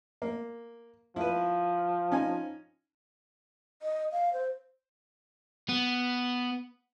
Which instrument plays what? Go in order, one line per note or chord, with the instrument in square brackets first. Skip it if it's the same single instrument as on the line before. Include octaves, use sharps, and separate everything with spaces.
[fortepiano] A#3
[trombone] F3 [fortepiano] E4 B4
[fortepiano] C#4 D#4 G#5
[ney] D#5
F5
C5
[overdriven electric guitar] B3